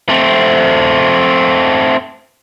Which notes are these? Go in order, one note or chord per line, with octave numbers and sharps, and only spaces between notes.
A3 C4